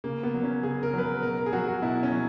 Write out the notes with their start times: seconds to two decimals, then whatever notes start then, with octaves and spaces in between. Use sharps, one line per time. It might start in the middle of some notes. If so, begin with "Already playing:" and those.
0.04 C#3 A#3
0.23 B3
0.34 F#3
0.43 C#4
0.63 C#3 G#4
0.83 A#4
0.93 F#3 B4
1.04 A#4
1.23 B2 A#4
1.38 A#4
1.46 G#4
1.52 F#3 F#4
1.68 F#4
1.82 B2 E4
2.03 C#4
2.12 F#3